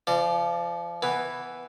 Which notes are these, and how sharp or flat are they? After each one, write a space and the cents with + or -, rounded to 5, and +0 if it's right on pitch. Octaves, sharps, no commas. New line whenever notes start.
F3 -25 D5 +20
E3 +0 B3 +0